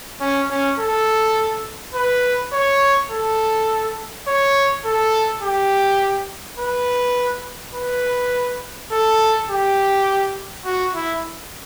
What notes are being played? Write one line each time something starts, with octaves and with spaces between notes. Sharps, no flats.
C#4
C#4
A4
B4
C#5
A4
C#5
A4
G4
B4
B4
A4
G4
F#4
E4